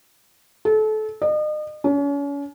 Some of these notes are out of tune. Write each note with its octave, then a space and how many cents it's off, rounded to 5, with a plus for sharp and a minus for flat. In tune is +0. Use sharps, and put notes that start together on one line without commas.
A4 -30
D#5 -40
C#4 +35